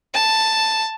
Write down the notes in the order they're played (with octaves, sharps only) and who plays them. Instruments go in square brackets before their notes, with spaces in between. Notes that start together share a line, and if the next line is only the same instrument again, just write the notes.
[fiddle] A5